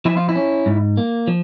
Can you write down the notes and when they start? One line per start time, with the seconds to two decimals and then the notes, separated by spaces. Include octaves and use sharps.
0.05 F3 E4
0.17 F4
0.29 E4
0.35 C#4
0.66 G#2
0.97 A#3
1.27 F3